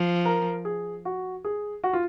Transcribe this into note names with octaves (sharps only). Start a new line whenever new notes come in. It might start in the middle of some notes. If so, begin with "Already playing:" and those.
Already playing: F3
A#4
G#4
F#4
G#4
F#4
F4